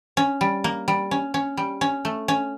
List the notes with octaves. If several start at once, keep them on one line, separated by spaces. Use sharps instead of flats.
C#4
G3
A#3
G3
C#4
C#4
G3
C#4
A3
C#4